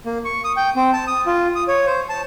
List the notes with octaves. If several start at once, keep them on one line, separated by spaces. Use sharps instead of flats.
A#3
C#6
D#6
G5
C4
A5
D#6
F4
D#6
C#5
C5
A5